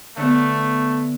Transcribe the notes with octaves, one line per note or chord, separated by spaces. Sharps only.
D3 A3 B3